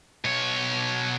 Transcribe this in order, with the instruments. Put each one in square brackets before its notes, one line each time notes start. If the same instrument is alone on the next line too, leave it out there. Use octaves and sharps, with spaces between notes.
[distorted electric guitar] B2 C#5